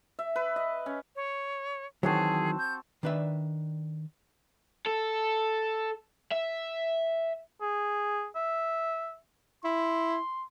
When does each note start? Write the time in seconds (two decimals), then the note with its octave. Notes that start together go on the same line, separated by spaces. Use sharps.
0.19 E5
0.36 B4
0.56 D#5
0.86 C#4
1.16 C#5
2.03 D#3 E3 F#3 C4 F#4 G#4 A5
2.58 G6
3.03 D#3 D4 B4 D5 E5
4.87 A4
6.32 E5
7.61 G#4
8.35 E5
9.64 E4 C6